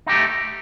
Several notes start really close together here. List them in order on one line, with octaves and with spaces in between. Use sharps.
D#4 G4 A3